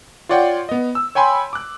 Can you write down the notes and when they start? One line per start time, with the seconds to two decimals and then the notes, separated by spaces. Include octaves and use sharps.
0.29 F4 C#5 D5 F#5 G5
0.69 B3 D#5
0.95 E6
1.15 C#5 G5 G#5 B5 C6
1.53 D6 F#6